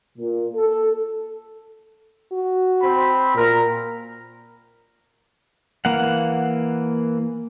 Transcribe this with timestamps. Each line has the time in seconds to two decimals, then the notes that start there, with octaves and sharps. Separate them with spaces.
0.18 A#2
0.55 A4
2.32 F#4
2.82 C4 C5 B5
3.35 A#2 A#4
5.85 E3 A#3 F5 F#5